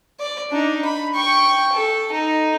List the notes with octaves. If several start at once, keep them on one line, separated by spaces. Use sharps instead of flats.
D5
D4 D#4
B5
G5 C#6
A4
D#4